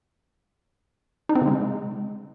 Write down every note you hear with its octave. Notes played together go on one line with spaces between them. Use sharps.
D#4
C4
C#3
G#3